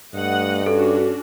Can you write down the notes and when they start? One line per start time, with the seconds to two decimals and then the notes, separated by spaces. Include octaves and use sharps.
0.15 G2 A3 D#5 F#5
0.66 C#4 D4 F#4 A4